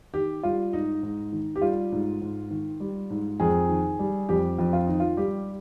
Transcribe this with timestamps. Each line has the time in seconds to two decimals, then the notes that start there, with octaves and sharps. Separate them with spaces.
0.13 D#3 G4
0.43 G3 F4
0.73 G#2 D#4
1.03 G#2
1.32 D#3
1.56 G4
1.62 G3 F4
1.92 G#2
2.21 G#2
2.51 D#3
2.80 G3
3.10 G#2
3.40 F2 G#4
3.69 D#3
3.99 G3
4.29 F2 G4
4.59 F2
4.73 F4
4.87 D#3 D#4
5.00 F4
5.17 G3 G4